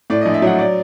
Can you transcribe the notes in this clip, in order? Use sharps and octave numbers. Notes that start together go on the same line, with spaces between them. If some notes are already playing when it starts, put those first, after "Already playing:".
A2 D5
A#1 D#5
E5
F#3 F#5
D5